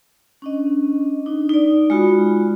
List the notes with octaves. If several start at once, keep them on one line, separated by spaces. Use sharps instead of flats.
C#4 D4 D#5
D4 D#4
D#4 D5
G#3 F4 F#4 B5